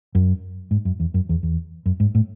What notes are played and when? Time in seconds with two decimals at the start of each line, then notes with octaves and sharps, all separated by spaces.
0.15 F#2
0.71 G#2
0.85 F#2
1.00 E2
1.14 F#2
1.29 E2
1.43 E2
1.86 F#2
2.00 G#2
2.15 A2